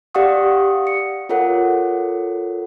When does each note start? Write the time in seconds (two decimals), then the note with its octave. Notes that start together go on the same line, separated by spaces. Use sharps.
0.15 G4 D5 F5 F#5 C#6 D#6
0.87 C#7
1.29 F4 A4 A#4 C#5 F#5